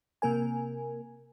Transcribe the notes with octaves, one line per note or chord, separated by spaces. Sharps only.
C3 A#3 A#4 G#5